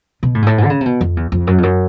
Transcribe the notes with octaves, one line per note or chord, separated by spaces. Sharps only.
B2
A2
G#2
A2
G#2
D3
C#3
C3
B2
F2
E2
F2
F#2
F2
F#2